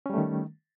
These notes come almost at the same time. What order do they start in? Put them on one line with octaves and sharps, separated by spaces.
C#4 G3 A3 D#3